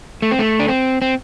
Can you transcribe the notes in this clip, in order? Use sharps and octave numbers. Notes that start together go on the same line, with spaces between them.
A3
C4
A3
D4
C4
C4